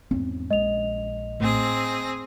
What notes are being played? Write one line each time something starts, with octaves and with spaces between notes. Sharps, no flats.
E2 G#2 C4 C#4
A#1 G#3 D#5 F7
A2 C4 G#4 A#6